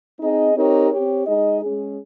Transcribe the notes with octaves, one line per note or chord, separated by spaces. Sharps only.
C4 D#4 G#4 D#5
C4 D#4 G4 A#4 C#5
C4 G4 C#5
G#3 D#4 G#4 D#5
G#3 C#4 G#4